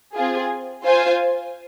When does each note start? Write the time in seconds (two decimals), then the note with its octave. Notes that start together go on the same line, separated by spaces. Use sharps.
0.15 C4 F4 G#4
0.84 F4 C5 F5 G#5